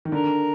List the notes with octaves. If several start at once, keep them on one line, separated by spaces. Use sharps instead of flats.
D#3
D3 A#4